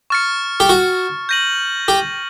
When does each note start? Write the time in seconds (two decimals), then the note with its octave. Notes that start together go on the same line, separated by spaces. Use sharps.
0.10 C#6 F6 A6 C#7
0.60 G4
0.69 F#4
1.29 G6 A#6 D#7 F#7
1.88 G4